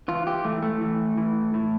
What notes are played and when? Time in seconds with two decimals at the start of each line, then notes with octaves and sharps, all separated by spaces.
0.08 E3 F4
0.27 G4
0.45 E3 A3
0.62 A3
0.81 E3
1.17 E3
1.54 A2